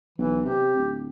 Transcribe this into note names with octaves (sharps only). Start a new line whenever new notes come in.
B1 E3
C3 G4
D1